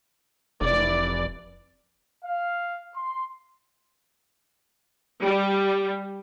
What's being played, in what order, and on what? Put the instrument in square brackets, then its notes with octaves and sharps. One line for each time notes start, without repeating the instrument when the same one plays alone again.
[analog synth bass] F1 [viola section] E3 D5
[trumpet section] F5
C6
[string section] G3